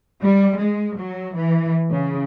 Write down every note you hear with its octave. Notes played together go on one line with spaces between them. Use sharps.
G3
G#3
F#3
E3
C#3